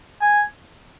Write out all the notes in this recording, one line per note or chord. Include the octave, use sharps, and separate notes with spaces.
G#5